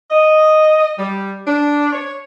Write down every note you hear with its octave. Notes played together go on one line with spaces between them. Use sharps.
D#5
G3
D4
C#5